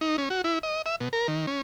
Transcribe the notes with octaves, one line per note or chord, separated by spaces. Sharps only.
D#4
C#4
F#4
E4
D#5
E5
B2
A#4
D#3
C#4